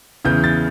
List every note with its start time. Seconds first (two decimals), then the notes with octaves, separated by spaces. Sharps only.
0.25 E2 C#3 E3 G6
0.44 A6